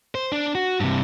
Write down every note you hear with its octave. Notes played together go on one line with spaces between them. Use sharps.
C5
D4
F#4
G2 C3